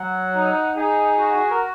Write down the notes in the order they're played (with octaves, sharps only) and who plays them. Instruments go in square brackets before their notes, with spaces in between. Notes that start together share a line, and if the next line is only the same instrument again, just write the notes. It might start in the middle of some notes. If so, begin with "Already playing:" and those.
Already playing: [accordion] F#3 [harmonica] F#5
[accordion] D#4
[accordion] D#4 [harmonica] G#4
[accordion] F#4
[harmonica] A#4